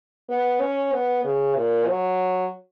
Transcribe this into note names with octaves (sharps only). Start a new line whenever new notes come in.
B3
C#4
B3
C#3
A#2
F#3